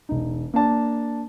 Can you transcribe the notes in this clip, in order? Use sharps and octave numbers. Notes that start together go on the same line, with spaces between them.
E1 D#4
A#3 D4 A5